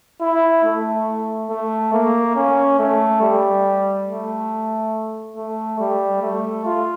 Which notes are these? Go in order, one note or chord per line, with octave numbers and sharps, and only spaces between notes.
E4
A3
A3
A#3
C#4
A3
G3
A3
A3
G3
A3
F4